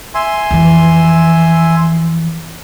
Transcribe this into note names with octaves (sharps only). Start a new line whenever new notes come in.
E5 G#5 C6
F2 E3